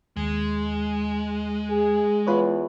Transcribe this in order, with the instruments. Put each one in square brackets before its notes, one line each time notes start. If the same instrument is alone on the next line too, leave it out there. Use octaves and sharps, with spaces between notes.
[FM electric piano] D#2 [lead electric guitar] G#3
[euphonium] G#4
[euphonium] E2 [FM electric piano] F4 B4 C#5